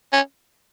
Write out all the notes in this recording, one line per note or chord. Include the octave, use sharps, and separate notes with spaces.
C#4